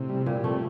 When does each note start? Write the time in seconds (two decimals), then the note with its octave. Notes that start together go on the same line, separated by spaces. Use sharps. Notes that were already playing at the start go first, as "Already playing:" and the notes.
Already playing: A2 C3
0.09 G3
0.26 A#2 G3
0.44 C3 A3